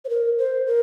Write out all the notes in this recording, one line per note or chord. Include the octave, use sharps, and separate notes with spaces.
C5
A#4
C5
A#4